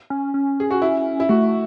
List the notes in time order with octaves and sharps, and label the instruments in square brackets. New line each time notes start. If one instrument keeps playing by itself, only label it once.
[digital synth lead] C#4
C#4
[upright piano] G#4
F#4
E4
E4
[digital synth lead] A3 [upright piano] F#4